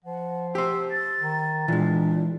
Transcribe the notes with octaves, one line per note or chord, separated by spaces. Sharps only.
F3 F#5
G4 C5 E6
A6
D#3
A#2 E3 G#3 D4